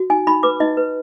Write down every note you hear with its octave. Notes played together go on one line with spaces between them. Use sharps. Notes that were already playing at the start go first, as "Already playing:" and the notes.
Already playing: F#4
D#4 G#5
D#4 B5
B4 D6
D#4 D#5
B4